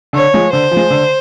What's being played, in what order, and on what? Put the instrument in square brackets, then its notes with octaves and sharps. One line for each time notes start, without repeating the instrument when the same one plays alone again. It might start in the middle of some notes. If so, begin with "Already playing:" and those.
[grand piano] D3 [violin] C#5
[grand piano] F3 G#3
[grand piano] D3 [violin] C5
[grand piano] F3
G#3
D3